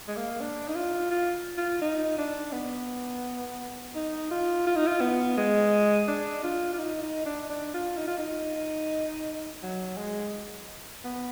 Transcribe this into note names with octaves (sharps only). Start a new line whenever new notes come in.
G#3
A#3
D4
D#4
F4
F4
F4
D#4
D4
B3
D#4
F4
F4
D#4
F4
B3
G#3
D4
F4
F4
D#4
D#4
D4
D4
F4
D#4
F4
D#4
F#3
G#3
B3